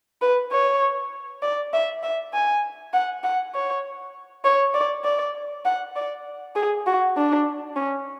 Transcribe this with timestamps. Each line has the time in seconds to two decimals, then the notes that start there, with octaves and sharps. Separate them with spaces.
0.21 B4
0.52 C#5
1.43 D5
1.73 E5
2.03 E5
2.33 G#5
2.93 F#5
3.24 F#5
3.54 C#5
4.45 C#5
4.74 D5
5.04 D5
5.65 F#5
5.96 D5
6.56 G#4
6.87 F#4
7.17 D4
7.76 C#4